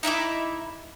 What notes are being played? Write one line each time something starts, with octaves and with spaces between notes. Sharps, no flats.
D#4 E4 E5 D6